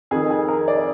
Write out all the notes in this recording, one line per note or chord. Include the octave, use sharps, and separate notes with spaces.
F2 D#3 G#4
G#4
A#4
D5